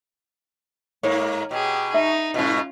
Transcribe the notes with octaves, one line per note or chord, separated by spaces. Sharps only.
G#2 A#3 C#5
B2 G4 G#4
D#4 E5
G#2 B2 C#4 F4